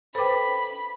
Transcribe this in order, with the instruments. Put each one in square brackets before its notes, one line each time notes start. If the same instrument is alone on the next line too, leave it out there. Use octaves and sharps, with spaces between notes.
[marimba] A4 B4 G5 [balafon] C5 D6 [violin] B5